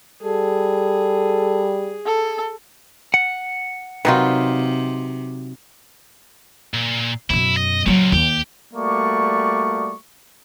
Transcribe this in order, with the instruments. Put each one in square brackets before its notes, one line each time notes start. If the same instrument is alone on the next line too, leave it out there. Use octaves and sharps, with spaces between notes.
[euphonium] G3 [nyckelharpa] G#4 [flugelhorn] A4
[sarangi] A4
[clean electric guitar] F#5
[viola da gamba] C3 [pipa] D#3 F4 [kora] F#3 D#4 B4
[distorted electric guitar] A#2
[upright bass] F#2 B2 [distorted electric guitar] E4
[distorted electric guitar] D#5
[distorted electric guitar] C#2 A#2 [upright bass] F3 F#3
[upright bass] D#2 [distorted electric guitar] G4
[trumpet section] G3 A3 A#3 F#4 D5 C#6